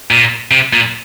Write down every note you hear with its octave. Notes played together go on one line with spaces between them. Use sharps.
A#2
C3
A#2